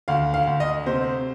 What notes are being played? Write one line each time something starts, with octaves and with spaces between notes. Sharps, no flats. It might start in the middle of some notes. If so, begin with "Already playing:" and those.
D2 F5
F5
D2
D#5
C3 C5